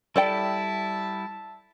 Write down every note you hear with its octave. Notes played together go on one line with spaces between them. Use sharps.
G3 E4 A4 D5 E5 G5 A5